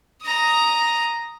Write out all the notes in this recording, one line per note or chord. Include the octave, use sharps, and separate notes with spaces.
A#5 D#6